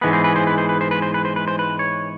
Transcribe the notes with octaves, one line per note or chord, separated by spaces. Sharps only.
G#2 E3 G#3 B3 B4
C5
B4
C5
B4
C5
B4
C5
B4
C5
B4
C5
B4
C5
B4
C#5